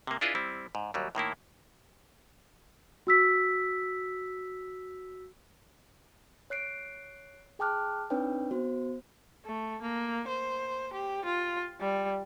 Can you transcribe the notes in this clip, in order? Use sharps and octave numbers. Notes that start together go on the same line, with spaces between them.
C3 A#3
D4 E4 F4 G#4 B4 D#5
G3 C4 E4
G#2
D#2 F#3 G3
A2 D#3 A#3 E4
F#4 E6 B6
C#5 F#6 C7 D7
G#4 G5 A5 D6 F6 F#6
C4 D4 D#4 B4 C#5 G5
B3 F#4 C5
A3
A#3
C5
G4
F4
G3